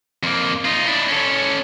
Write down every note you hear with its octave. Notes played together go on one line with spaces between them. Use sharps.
F2 A#3
D#4 F4
D4 E4
C#4 A4